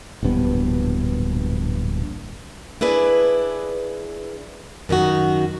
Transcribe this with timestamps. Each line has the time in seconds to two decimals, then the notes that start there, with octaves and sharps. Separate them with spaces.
0.23 D1 A#1 G2 B3
2.81 D4 E4 G#4 B4 D5
4.89 F#2 D#3 D#4 F#4